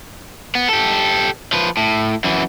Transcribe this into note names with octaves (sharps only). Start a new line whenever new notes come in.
B3
G4 A4
F3 B4
A2
F#2 E3